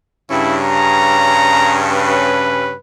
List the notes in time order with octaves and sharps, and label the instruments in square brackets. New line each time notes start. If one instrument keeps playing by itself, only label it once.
[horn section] G2 C#3 C#4 [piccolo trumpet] E4
[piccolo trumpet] A#5
B4